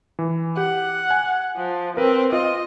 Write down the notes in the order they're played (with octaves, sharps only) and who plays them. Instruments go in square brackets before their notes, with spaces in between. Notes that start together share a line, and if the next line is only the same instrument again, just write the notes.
[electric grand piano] E3
[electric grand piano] G4 [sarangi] F#5
[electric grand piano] G#5
[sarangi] F3
[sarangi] C4 [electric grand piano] A#4 B4
[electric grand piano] F4 [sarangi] D#5